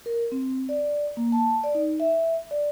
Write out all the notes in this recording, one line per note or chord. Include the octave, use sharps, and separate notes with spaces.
A#4
C4
D5
A#3
A5
D5
D#4
E5
D5